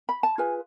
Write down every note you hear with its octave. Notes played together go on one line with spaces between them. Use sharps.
B5
A5
F4 G#4 B4 G#5